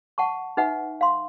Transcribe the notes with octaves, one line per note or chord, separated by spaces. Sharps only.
F#5 A5 C#6
D#4 B4 E5 F#5
F5 C6